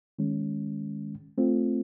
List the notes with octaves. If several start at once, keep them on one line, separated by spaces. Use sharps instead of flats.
D#3 G#3 C#4
A3 C4 F4